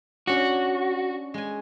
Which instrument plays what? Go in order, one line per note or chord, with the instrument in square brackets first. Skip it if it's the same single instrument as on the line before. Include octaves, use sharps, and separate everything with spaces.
[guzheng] C#4 D4 [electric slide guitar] F#4
[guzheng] G#3 G#5